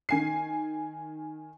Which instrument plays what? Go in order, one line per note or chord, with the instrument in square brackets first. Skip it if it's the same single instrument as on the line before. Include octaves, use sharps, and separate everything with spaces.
[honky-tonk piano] D#3 G#5 C7